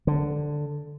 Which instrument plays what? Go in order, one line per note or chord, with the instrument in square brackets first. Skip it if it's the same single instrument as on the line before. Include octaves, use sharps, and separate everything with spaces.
[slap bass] D3